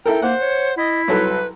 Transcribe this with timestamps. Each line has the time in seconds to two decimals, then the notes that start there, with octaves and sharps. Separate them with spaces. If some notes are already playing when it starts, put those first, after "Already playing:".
0.06 E4 A4 A#4 G5
0.22 A#3 C5 F#5
0.41 C#5
0.78 E4 D#5
1.08 C2 F#3 A4 B4